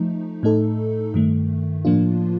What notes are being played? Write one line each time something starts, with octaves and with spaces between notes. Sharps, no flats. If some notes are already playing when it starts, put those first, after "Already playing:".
Already playing: F3 A3 D#4
A2 A3 D#4 A4
G2 D#3 A3
A2 F3 A#3 D4 F4